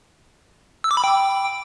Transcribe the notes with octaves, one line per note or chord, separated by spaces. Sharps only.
E6
D6
B5
G5